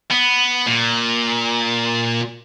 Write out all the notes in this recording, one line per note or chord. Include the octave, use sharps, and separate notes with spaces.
B3
A#2